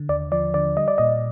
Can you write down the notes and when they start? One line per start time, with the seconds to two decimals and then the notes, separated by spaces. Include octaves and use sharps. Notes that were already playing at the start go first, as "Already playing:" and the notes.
Already playing: D3
0.09 D#2 D5
0.32 F3 D5
0.54 D3 D5
0.77 G3 D#5
0.88 D5
0.98 A#2 D#5